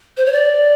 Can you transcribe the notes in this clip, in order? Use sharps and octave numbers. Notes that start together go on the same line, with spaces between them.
C5
C#5
D5